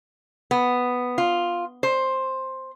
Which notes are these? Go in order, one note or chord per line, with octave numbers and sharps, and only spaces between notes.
B3
F4
C5